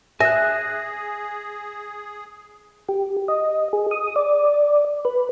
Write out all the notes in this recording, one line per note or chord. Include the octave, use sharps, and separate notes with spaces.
G#4 E5 G#5 F#6 A#6
G4
D#5
G#4
D#6
D5
B4